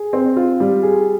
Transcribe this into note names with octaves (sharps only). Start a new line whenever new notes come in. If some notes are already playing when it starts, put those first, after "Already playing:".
Already playing: G#4
C4
F4
G3
G#4